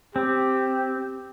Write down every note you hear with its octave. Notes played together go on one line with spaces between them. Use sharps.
C4 G4